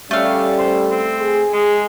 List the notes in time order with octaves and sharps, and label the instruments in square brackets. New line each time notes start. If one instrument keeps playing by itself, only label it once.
[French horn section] G3 C#4 [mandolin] A3 F5
[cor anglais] C5
C4
[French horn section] G#4
[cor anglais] G#3